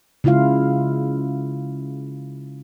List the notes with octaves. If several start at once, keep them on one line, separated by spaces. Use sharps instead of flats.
C#3 G#3 E4 F4 F5